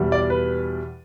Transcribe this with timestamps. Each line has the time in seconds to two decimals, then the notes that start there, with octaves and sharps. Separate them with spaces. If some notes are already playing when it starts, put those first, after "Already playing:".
Already playing: E2 B2 G3
0.12 D5
0.30 B4